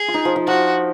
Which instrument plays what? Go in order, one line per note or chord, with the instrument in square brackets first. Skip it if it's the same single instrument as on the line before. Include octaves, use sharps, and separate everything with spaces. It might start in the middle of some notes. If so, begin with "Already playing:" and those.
Already playing: [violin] G#4
[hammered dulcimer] F4
D#4
F3
F3
[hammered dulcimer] F3 [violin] F#4